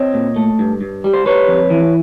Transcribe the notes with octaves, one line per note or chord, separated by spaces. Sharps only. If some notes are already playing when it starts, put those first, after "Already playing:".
Already playing: C4 C#5 D#5
A#2
A3
G2
G2
G3
C5
G3 B4 C#5
F2
E3